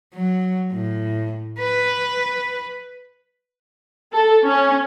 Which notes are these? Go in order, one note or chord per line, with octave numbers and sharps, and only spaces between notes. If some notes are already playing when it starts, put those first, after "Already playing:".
F#3
A2
B4
A4
C#4